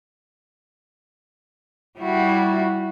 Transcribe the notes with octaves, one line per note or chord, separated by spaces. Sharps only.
G3 E4 F#4